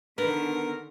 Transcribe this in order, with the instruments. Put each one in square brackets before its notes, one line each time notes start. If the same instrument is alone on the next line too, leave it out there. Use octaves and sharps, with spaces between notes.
[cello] D3 D#3 [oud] B3 [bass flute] D4 [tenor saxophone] A#4